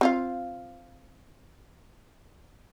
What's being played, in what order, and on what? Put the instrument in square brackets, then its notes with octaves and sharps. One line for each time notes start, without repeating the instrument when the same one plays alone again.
[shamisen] C4 F4 F5